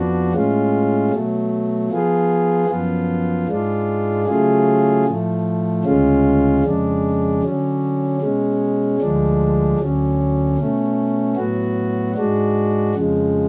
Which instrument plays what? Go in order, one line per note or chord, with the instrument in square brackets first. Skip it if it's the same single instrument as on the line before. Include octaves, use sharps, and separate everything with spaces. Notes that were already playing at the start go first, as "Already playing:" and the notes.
Already playing: [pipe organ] F2 F3 B3 D4 F#4
A2 G#3 C#4 F4
B2 F#3 A3
F3 B3 F4 G#4
F#2 F3 B3 F4
G#2 G#3 D4 F4
C#3 F#3 A3 F4 G#4
A2 F3 A3
D2 C#3 G#3 C#4 F4
F2 C#3 G#3 D4
D3 F#3 C#4
B2 G#3 C#4
D2 D3 F3 G#3 D4
D2 D3 F#3 C#4
B2 A3 C#4
A2 F#3 B3 F#4
G#2 G#3 D4 F#4
F2 C#3 F3 G#3